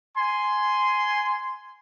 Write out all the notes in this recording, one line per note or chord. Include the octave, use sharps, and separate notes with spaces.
G#5 C6